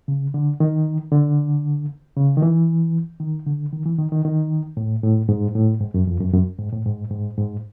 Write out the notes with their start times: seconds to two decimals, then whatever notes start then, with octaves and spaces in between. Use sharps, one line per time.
0.08 C#3
0.34 D3
0.60 D#3
1.12 D3
2.16 C#3
2.37 D#3
2.42 E3
3.20 D#3
3.47 D3
3.73 D#3
3.86 E3
3.98 D#3
4.12 D#3
4.25 D#3
4.77 A2
5.03 A2
5.29 G#2
5.55 A2
5.81 G#2
5.94 F#2
6.07 F2
6.21 F#2
6.33 F#2
6.59 G#2
6.72 A2
6.85 G#2
7.11 G#2
7.38 G#2